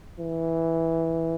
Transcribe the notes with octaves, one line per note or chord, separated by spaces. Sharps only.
E3